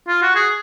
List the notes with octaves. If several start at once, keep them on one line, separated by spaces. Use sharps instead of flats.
F4
F#4
G#4